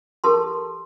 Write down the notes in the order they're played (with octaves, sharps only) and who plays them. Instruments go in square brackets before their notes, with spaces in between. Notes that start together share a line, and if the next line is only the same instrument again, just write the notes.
[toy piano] G4 A4 A#4 A5 C6